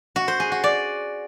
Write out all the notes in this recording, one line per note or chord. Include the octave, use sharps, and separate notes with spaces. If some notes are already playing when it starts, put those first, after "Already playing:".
F#4
C5
G#4
F#4
D5